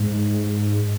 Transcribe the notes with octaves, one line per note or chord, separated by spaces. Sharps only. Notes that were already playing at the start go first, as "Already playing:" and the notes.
Already playing: G#2